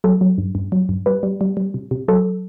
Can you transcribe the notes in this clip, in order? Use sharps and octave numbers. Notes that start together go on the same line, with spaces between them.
F#3 A4
F#3
G2
G2
F#3
G2
G3 B4
G3
G3
G3
C3
C3
F#3 A4